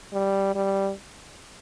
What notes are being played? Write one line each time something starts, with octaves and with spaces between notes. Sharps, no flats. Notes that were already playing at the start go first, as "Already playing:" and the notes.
G3
G3